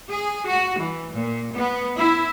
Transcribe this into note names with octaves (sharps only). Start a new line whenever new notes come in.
G#4
F#4
E3
A#2
B3
E4